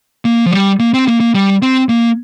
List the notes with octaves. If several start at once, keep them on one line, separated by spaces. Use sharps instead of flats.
A#3
F3
G3
A#3
C4
A#3
A#3
G3
C4
A#3